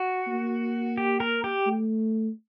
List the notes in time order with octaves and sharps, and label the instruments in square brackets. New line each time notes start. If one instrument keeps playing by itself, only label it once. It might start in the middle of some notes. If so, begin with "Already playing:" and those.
Already playing: [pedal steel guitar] F#4
[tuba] A#3
[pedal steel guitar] G4
A#4
G4
[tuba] A3